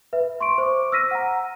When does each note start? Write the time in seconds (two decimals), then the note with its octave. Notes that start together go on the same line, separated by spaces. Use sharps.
0.13 B4 E5
0.41 C6 C#6 D7
0.58 C5 C#6 D6
0.92 E6 F6 A#6 B6 D#7
1.11 F#5 A#5